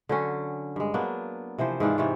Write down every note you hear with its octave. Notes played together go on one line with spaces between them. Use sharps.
D3 F#3 C#4
G2 G#3
F#3 A#3 B3 D4
C3 E3 F3 C5
G#2 E3 D4 F4
C3 E3 C4 C#5